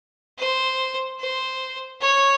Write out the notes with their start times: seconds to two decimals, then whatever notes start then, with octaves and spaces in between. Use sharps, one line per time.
0.38 C5
1.20 C5
2.01 C#5